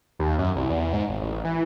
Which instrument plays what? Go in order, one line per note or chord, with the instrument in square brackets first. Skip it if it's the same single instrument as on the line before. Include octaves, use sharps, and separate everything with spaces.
[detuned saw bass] D#2
F#2
C2
E2
G#2
G#1
A1
E3